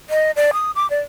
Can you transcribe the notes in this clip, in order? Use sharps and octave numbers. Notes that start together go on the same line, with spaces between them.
D#5
D5
D#6
D6
D5